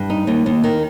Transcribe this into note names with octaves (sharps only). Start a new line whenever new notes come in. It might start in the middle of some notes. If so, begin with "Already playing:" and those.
Already playing: G2
D#4
D#2
D#2
D#3